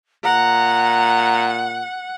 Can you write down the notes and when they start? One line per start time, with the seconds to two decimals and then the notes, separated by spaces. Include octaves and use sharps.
0.24 A#2 F#5 A#5